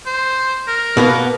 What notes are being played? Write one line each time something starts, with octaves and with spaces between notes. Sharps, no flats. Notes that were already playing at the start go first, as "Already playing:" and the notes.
C5
A#4
B2 A#3 B3